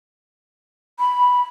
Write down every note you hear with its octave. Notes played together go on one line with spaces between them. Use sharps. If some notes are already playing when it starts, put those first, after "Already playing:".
B5